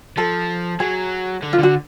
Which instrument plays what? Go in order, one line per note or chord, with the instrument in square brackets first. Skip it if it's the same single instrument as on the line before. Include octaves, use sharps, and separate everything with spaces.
[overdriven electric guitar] F3 [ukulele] A4
[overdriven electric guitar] F#3 [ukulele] G#4
[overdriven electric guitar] D3
[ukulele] F4
[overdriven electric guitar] D3 [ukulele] F#4